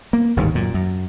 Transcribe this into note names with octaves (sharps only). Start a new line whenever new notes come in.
A#3
G1 D#2 G#2
F#2 A#2
F#2